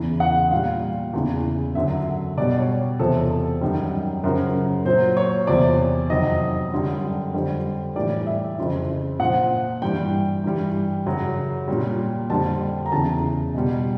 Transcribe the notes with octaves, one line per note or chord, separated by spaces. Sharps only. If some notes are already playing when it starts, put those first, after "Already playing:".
Already playing: E2 C#3 E3
F#5
A#2 G3 F5
E2 C#3 E3
F#2 D3 F#3 E5
B2 G3 D5
C#5
E2 C3 F3 A4
F#2 D#3 G3
F#2 C#3 F3 A#4
A#2 F#3 C5
C#5
E2 C3 F3 D5
F2 C3 D#3 F#3 D#5
F#2 D3 G3
F2 D3 G3
A2 E3 G3 D5
E5
F2 C#3 E3
A#2 F3 F#5
G2 E3 G3 G5
G2 E3 G3
F#2 C#3 F#3
A#2 G3
F2 D3 G3 A5
A#5
E2 C#3 E3 A5
B2 G3